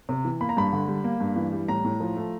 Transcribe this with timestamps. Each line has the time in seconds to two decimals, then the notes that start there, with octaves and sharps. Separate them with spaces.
0.09 C3
0.25 E3
0.41 A#3 B5
0.49 A#5
0.57 G2 B5
0.73 D3
0.88 G3
1.04 A#3
1.20 G2
1.36 E3
1.52 G3
1.68 A2 A#5
1.84 A2
2.00 F3
2.16 A3